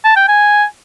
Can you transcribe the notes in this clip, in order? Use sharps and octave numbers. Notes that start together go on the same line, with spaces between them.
A5
G5
G#5